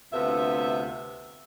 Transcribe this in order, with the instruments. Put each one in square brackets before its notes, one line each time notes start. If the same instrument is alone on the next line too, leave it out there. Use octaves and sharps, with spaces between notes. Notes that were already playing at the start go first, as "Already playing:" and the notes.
[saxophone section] D2 C3 B3 F4 A4 E5